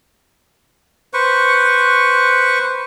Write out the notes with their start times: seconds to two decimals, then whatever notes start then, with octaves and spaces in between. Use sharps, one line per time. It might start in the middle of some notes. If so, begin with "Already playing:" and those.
1.14 B4 C5 C#6